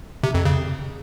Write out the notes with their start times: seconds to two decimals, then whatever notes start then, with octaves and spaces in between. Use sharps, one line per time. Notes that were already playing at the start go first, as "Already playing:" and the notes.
0.23 C3
0.34 F2
0.45 C#3